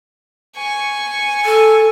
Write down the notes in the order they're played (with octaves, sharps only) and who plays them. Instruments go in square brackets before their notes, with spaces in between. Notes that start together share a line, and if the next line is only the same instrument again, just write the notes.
[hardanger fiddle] G#5 C#6
[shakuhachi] A4